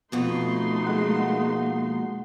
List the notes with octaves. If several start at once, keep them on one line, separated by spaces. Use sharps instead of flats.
F2 B2 A3 D#4 B4 C6
G#3 A#3 F#5